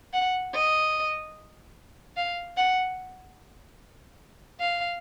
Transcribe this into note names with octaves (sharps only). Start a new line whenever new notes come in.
F#5
D#5
F5
F#5
F5